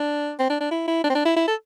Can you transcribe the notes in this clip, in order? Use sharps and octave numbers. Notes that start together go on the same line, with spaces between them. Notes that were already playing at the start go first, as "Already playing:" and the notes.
Already playing: D4
C4
D4
D4
E4
E4
D4
C4
D4
E4
E4
A4